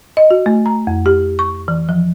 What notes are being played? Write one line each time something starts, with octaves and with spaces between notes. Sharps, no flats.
D#5
F#4
A3
A#5
F2
G4
C#6
E3
F3